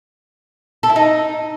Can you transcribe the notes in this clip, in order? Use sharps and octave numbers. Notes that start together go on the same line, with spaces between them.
A4
E4
D#4